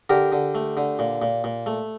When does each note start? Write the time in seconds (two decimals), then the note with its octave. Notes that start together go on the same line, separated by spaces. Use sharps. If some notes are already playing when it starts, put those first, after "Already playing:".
0.10 D3 G4 A#4
0.32 D3
0.55 A3
0.77 D3
0.99 A#2
1.22 A#2
1.44 A#2
1.66 A3